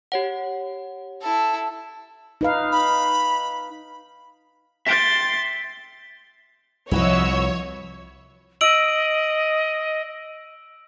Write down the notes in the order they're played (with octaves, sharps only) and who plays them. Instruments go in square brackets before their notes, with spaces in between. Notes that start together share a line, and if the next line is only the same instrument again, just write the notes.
[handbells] G4 C#5 F#5
[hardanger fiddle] E4 A4
[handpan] D#4 B4 F5
[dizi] B5
[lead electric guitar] E5 G5 [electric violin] C6 A6
[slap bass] C2 [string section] F3 D#5 E6 [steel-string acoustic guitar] E4 F#4 B4 [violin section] C#5
[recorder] D#5 [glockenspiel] E6 D7 F#7